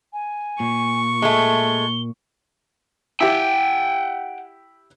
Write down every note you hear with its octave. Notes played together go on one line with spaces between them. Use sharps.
G#5
A#2 C#6
G#3 A3 G7
E4 G4 F#5 G5